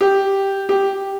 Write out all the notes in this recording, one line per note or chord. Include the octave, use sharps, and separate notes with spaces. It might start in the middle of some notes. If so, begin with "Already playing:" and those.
G4
G4